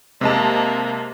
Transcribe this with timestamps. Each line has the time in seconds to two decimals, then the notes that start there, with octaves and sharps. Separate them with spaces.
0.21 C3 G#3 A#3 A5